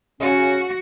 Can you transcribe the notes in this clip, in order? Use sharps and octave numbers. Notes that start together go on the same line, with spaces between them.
C#3 C#4 F#4